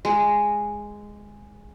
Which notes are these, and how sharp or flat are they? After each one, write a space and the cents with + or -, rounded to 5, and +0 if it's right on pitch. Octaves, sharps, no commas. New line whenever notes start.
G#3 -5